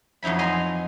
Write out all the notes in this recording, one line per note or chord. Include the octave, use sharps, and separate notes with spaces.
F2 F#3 D#4 E4 B5
D#5 G#5 A#5 C6